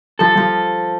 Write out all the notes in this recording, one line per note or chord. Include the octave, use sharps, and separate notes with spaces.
F3 A4
F3